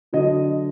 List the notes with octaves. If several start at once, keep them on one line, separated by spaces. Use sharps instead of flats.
D3 F#3 D#5